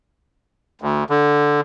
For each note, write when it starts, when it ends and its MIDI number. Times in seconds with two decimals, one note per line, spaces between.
0.81 1.04 38
1.10 1.61 50